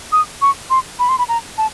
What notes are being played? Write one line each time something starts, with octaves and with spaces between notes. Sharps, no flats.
D#6
C#6
C6
B5
C6
B5
A#5
A5